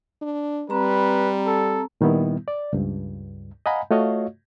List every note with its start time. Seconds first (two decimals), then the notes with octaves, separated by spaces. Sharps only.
0.21 D4
0.70 G3 C4 B4 A#5
1.47 A4
2.01 A#2 D#3 G3 B3 E4
2.48 D5
2.73 C#2 G2
3.66 D#5 F5 F#5 G#5 A#5 B5
3.91 A3 F4 F#4 C#5 D#5 F5